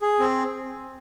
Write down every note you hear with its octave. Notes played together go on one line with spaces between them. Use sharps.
G#4
C4